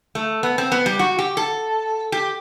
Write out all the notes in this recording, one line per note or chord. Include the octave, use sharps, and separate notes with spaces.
A3
B3
C4
B3
G3
F#4
G4
A4
G4